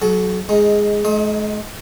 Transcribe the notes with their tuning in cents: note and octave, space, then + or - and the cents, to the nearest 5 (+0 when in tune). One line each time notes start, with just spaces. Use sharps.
F#3 +5 A4 -45
G#3 +0 D#4 +15
G#3 +45 D#4 +10 D#6 +45